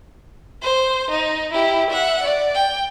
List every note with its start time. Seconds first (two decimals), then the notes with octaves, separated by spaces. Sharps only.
0.62 C5
1.10 D#4
1.53 E4 G4
1.90 E5 F#5
2.23 D5
2.54 G5